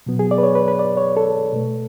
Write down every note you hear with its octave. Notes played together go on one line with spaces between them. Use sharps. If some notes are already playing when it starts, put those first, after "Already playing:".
B2 F#3 B3
G#4
D5
B4
C#5
B4
B4
D5
C#5
A4
B2 A3